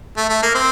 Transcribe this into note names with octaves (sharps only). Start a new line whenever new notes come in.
A3
A3
A#3
C4